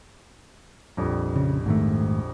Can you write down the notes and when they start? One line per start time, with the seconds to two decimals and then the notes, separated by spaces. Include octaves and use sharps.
0.97 A#1 F2 G3
1.36 C#3
1.66 G#2 D#3 A3